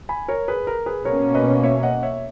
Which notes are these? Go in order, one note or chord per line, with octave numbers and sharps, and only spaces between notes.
G#5 B5
A#4 C#5
G#4 B4
A#4
G#4 B4
B2 A#3 C#4 A#4 C#5
B4 D#5
C#5 E5
D#5 F#5
C#5 E5